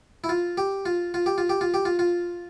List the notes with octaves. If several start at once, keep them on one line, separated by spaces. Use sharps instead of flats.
E4
F4
G4
F4
F4
G4
F4
G4
F4
G4
F4
F4